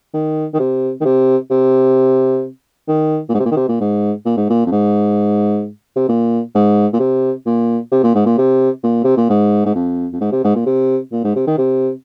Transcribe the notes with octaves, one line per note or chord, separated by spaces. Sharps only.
D#3
D#3
C3
D#3
C3
C3
D#3
A#2
G#2
C3
A#2
D#3
C3
A#2
G#2
A#2
G#2
A#2
F2
G#2
C3
A#2
G#2
A#2
C3
A#2
C3
A#2
G#2
A#2
C3
A#2
C3
A#2
G#2
G#2
F2
F2
G#2
C3
G#2
A#2
C3
A#2
G#2
C3
D#3
C3